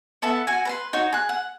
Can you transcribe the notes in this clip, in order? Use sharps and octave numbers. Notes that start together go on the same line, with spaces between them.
B3 A4 E5 A5
F#4 G#5
B4 G#5 C6
D#4 F#4 C#5
G#4 F#6
F#5